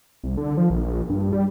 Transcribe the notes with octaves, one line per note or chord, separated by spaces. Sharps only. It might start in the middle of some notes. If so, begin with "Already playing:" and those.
C2
D3
F3
A#1
G2
G3